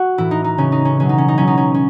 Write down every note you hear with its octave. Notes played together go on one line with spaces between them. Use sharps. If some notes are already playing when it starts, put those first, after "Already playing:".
Already playing: F#4
A2 E3 E4
D#4
D#4
C#3 E3 C#4
D#4
C#4
B2 F#3 C#4
D#4
C#4
D#4
B2 F#3 C#4
D#4
C#4
C#4